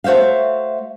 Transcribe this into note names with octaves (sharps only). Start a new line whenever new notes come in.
A3 F#4 C5 E5 F5